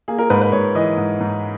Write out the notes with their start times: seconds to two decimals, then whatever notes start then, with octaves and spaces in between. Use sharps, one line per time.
0.08 A#3 G#4
0.19 A#4
0.30 G#2 B4
0.42 B4
0.52 G#2 C#5
0.75 E3 D#5
0.98 G#2
1.20 G#2